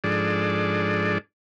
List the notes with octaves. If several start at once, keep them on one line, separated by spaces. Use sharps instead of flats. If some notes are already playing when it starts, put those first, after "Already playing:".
G#2 F3 D4 G#4 A4 D5